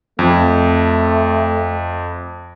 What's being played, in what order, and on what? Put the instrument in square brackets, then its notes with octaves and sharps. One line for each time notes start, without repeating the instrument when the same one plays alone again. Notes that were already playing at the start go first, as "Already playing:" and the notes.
[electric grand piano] F2 [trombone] A3